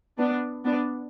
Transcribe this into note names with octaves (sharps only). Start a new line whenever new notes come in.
B3 D4
B3 D4